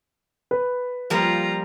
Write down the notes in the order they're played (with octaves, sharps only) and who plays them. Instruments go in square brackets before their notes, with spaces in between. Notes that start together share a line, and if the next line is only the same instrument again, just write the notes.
[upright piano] B4
[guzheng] F3 G3 A#3 [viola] F4 A#5